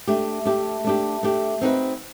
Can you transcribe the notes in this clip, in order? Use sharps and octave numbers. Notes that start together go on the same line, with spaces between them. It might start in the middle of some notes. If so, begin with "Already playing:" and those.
A3 D4 G4
A3 D4 G4
A3 D4 G4
A3 D4 G4
C4 D#4 F#4 B4